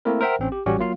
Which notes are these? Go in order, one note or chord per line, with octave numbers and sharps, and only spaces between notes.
A3 A#3 C4 E4 A#4
A#4 C5 E5 F#5 G5
A1 C4 C#4
G4
A1 G3 C#4 F#4 G4
F#3 A#3 F4 F5